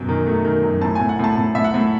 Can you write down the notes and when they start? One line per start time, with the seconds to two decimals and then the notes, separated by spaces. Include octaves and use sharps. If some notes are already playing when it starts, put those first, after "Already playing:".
Already playing: F#2 B2 F#3
0.09 D#3
0.26 A3
0.45 D#3
0.63 F#2
0.81 A2 A5
0.95 A2 G#5
1.09 F#5
1.19 A2 A5
1.37 A2
1.55 A2 E5
1.64 F#5
1.74 A2